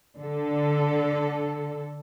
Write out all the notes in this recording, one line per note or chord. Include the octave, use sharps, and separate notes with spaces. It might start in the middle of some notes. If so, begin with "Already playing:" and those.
D3 A4